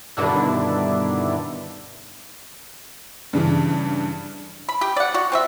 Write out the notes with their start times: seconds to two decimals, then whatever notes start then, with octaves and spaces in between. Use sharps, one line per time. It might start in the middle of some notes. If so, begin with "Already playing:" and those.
0.17 G2 B2 D3 D#3 D4 E4
3.33 G2 C#3 E3
4.69 B5
4.81 G4 G5
4.97 D5 F#5
5.14 F#4
5.32 C4 F#4 E5